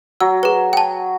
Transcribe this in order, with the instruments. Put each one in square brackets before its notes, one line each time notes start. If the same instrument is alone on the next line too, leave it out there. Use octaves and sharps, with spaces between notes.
[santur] F#3 [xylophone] E6
[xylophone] G#4 B4
G5 A5